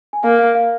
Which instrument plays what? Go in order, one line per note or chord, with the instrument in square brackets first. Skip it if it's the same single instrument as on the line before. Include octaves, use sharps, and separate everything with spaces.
[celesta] G#5
[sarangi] A#3 [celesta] F5
[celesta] F5
F5